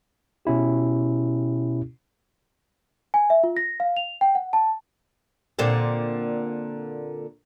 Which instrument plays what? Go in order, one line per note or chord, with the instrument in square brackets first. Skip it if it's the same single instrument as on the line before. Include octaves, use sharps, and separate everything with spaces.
[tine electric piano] B2 C#4 E4 G4
[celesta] G#5
E5
F4
A#6
F5
F7
G5
F#5
A5
[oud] A#2 D3 C4